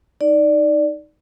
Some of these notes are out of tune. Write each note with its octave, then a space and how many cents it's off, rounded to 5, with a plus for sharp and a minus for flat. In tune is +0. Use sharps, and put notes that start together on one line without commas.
D#4 +0 D5 +0